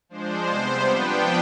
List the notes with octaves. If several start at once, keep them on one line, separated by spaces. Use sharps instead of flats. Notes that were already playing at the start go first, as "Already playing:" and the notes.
F3 G#3 D4 C5
C3 G3 B3 C5
F3 B3 D4 G5